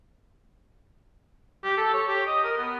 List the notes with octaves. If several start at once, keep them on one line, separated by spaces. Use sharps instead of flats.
G4
A4
C#5
G4
D#5
A#4
B3